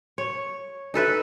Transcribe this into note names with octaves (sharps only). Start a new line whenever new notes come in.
C#5
D#4 A4 B4 E5